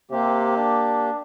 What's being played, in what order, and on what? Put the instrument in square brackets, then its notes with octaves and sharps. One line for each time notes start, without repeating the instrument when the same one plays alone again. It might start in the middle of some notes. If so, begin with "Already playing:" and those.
[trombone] C3 [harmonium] A#3 G4
[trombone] D4